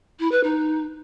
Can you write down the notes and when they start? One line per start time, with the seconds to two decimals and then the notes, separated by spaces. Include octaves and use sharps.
0.20 E4
0.32 B4
0.44 D#4